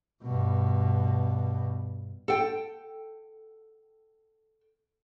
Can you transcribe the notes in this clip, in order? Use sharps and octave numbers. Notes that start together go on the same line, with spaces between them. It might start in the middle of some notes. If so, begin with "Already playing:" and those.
G2 B2
A4 G5